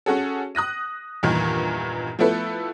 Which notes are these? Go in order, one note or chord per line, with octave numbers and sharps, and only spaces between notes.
C#4 F#4 G#4 A4
D#6 F#6 A#6 D#7
E2 G2 A#2 D#3 E3
F3 A3 B3 E4 A4 B4